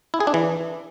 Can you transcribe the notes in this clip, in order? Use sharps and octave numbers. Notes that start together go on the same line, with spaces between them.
E4
G#4
D4
E3